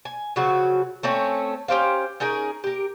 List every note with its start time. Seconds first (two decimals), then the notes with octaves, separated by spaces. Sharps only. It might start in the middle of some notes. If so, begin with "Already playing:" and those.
0.05 G#5
0.36 C#3 F3 F#3 F#4
1.03 A3 C4 C#4 C#5
1.68 C#4 G4 C5 F5
2.20 C#4 D#4 G#4 A#4
2.64 G4 A#4